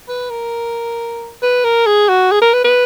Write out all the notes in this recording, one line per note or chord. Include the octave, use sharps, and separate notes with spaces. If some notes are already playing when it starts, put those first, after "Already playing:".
B4
A#4
B4
A#4
G#4
F#4
G#4
A#4
B4
B4